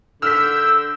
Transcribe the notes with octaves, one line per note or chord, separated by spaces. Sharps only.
D3 E6 F6 G6 B6